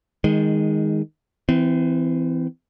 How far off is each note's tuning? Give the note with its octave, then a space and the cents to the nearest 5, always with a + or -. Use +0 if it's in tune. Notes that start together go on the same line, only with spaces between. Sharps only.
D#3 +10 G#3 -10
E3 +0 C4 -30